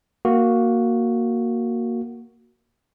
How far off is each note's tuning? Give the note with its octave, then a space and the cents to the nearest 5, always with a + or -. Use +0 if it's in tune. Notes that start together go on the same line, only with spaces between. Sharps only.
A#3 +0 F#4 +0